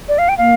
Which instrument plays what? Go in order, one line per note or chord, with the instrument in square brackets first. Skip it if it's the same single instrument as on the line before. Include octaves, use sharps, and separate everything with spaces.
[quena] D5
F5
G5
[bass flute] A#3 [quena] F5